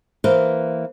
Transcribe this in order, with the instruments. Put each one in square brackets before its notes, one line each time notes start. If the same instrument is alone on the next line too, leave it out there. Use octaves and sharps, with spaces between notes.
[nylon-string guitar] E3 A#3 B4 C5